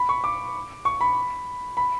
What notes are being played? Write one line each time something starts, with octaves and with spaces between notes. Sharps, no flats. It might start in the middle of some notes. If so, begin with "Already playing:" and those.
Already playing: B5
C#6
D6
C#6
B5
B5